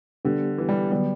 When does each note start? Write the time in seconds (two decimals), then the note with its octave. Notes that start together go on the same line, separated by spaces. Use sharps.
0.25 D3 G3 B3 D4 G4
0.58 E3
0.69 G3
0.91 D3 F#3 G3 B3